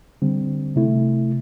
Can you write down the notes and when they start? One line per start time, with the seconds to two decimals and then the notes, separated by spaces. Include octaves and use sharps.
0.22 D3 G3 C4
0.76 C3 A3 E4